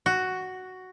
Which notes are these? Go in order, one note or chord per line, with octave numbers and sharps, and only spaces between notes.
F#4